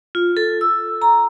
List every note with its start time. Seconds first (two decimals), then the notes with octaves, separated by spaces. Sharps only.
0.15 F4
0.37 A4
0.61 E6
1.02 A#5